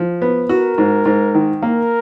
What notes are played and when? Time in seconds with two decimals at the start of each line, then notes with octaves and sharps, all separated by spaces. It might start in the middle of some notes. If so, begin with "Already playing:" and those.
Already playing: F3
0.22 B3
0.49 F#4 A#4
0.78 G#2
1.05 G#2
1.35 D#3
1.62 A#3 A#4